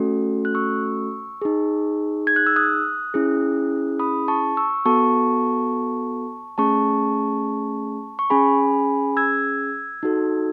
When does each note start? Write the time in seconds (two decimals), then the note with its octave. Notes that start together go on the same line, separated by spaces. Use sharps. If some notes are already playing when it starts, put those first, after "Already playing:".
Already playing: A3 C#4 F#4 A4
0.45 F#6
0.54 C#6 E6
1.42 D#4 G#4
2.27 G#6
2.36 F#6
2.47 E6
2.56 D#6 F#6
3.14 C#4 E4 G#4
3.99 B5 D#6
4.28 A5 C#6
4.57 C#6 E6
4.85 B3 F#4 A4 A5 C#6
6.58 A3 C#4 G#4 A5 C#6
8.19 C#6
8.30 C#4 G#4 G#5 B5
9.17 E6 G#6
10.03 D#4 F#4 A4